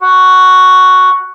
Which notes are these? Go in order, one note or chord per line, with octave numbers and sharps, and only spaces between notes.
F#4